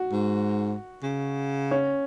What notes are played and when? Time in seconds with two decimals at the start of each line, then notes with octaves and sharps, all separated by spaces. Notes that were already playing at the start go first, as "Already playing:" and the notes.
Already playing: F#4
0.12 G#2
1.03 C#3
1.71 C#4